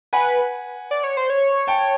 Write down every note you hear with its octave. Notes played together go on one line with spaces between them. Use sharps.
B4 F#5 G#5
D5
C#5
C5
C#5
G5 A5